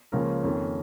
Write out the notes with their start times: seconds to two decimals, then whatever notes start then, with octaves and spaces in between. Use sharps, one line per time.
0.12 C#2 C#3 F3 A#3 C#4 A#4
0.43 F2 D#3 A#3 C#4